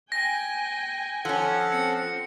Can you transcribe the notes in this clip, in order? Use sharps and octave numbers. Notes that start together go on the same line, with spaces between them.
G5 G#5 A#6
F3 C#4 A4 F#5
C4 C#7